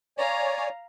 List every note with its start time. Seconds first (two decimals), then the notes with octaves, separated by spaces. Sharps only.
0.18 C#5 D5 F5 G#5 A#5